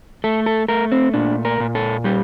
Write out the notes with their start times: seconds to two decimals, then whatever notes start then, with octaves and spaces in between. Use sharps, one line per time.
0.24 A3 A4
0.46 A4
0.68 A3 A#4
0.92 C4
1.14 A#2 D4
1.45 A#4
1.60 A#2
1.75 A4
2.04 G3 G4